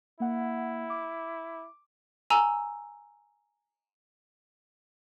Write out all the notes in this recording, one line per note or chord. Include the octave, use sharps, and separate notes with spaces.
A#3 E4 F#5
D6
G#5 A#5 E6